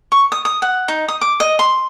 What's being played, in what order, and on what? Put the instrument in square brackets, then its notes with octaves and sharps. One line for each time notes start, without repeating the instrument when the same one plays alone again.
[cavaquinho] C#6
D#6
D#6
F#5
D#4
D#6
D6
D#5
C6